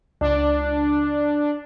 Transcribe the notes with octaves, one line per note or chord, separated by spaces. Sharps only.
C#2 D4